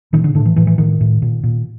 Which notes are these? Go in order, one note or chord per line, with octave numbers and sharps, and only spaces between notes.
A#2 D#3
D3
A2 D3
E3
A2 E3
E3
A2 D#3
A2
A#2
A#2